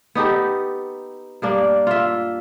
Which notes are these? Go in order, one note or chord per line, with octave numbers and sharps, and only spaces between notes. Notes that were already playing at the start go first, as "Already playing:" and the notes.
B3 D#4 G4 A4
G2 A#3 D4
F4 E5